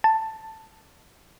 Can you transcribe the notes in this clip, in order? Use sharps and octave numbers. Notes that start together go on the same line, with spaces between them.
A5